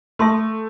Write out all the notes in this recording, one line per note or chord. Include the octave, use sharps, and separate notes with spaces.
A3 A4 E5 A5 C6